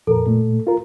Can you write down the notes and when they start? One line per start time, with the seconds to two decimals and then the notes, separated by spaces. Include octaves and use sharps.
0.07 F2 A#2 A4 A#4
0.26 A#2 A3
0.67 F4 A#4